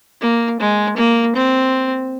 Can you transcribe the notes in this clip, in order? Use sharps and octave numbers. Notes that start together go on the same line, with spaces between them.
A#3
G#3
A#3
C4